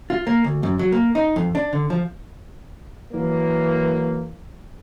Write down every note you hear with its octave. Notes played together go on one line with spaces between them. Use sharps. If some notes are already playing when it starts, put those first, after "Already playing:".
F4
A#3
D2
F#2
F#3
A#3
D#4
F2
D4
D3
F3
E3 F#3 A#3